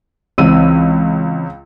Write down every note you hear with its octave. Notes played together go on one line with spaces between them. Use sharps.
C#2 E3 C4 E6 D#7